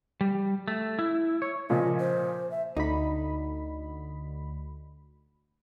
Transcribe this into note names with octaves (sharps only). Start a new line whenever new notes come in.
G3
A3
E4
C#5
A#2 C#3 F3 D#5
C5
E5
D2 D#4 B5